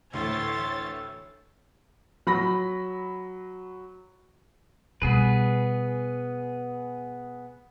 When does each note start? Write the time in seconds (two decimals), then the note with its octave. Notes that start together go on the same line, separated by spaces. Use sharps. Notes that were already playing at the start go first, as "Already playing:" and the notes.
0.13 D2 A2 E3 C#5 C6 E6 A6
2.27 F#3 B5 A#6
5.02 B2 G3 B3 G#4 B4